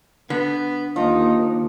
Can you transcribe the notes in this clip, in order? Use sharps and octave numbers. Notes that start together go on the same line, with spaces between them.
D3 B3
D#2 F3 D#4